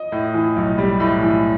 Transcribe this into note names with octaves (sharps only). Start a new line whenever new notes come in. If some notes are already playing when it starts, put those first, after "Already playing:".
Already playing: D#5
A2
E3
B1
G3
A2
E3